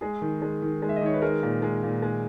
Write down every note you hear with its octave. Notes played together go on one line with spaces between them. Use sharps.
G#3 G#4
D#3
G#3
D#3
G#3
E5
D#5
D#3 C#5
B4
G#3 A#4
A#2
G#3
A#2
G#3